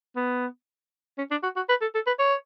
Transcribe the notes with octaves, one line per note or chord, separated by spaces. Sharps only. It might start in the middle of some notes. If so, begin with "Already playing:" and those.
B3
C#4
D4
F#4
F#4
B4
A4
A4
B4
C#5